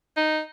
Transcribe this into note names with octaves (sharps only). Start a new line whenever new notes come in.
D#4